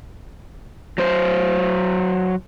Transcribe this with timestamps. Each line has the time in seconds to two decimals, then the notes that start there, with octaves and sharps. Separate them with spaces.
0.98 F#3 C5